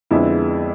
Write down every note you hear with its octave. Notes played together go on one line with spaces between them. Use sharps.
F2 D3 G#3 B3 E4